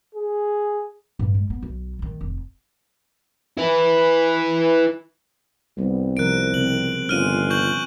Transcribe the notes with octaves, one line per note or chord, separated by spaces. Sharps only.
G#4
G2
G#3
B3
B1
D#3 A3
F1
E4 B4
C2 G3 B3
C3 F3 A#4 F#6 D7
C#3 C4 F#7
G1 C#4 F4 F6 D#7
C#6 G6 F#7